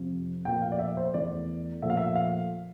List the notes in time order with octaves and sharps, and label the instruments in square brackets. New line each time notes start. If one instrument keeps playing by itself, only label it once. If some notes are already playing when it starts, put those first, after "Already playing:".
Already playing: [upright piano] F2 C3 F3
A#2 F3 A3 G5
F5
D5
E5
C5
E2 E3 A3 D5
A#2 F3 A3 E5
F5
E5
F5